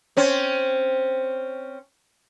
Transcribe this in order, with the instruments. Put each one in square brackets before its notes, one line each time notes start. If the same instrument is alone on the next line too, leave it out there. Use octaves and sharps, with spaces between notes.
[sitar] C4 C#4